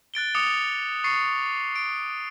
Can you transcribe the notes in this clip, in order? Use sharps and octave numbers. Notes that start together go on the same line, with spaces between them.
F#6 A6 D7 G7
D6 D#6 C#7 F7
C#6 A6 C7 C#7
D7